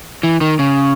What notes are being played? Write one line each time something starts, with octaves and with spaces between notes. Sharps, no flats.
E3
D#3
C#3